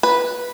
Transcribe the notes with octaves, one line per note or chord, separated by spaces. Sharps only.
B4